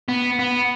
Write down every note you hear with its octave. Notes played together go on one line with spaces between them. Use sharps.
B3
B3